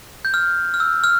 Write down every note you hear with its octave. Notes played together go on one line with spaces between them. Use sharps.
G6
F6
F6
E6
F6